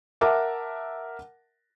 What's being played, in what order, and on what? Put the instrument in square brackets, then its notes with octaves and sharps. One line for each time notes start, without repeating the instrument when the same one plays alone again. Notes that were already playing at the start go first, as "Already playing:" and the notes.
[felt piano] A#4 E5 F#5 A5 D6